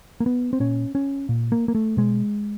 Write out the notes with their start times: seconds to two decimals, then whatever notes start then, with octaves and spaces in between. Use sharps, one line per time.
0.20 A#3
0.26 B3
0.53 C4
0.60 A#2 C#4
0.95 C#4
1.29 A#2
1.52 A#3
1.68 A#3
1.75 A3
1.97 B2 G#3